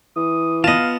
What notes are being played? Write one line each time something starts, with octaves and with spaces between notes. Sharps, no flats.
E3 D#6
B3 F4 D#5 F5 A5